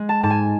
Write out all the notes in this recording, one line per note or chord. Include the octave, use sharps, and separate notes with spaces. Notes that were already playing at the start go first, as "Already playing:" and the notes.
Already playing: G#3
A5
G#2 A5
G#5